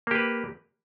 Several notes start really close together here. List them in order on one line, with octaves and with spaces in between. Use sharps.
A#3 G4 B4